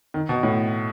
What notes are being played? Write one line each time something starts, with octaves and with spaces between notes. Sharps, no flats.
D#3
B2
A2